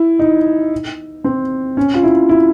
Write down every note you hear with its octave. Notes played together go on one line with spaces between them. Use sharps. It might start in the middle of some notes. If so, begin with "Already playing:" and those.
Already playing: E4
D#4
C4
C#4
F4
E4
E4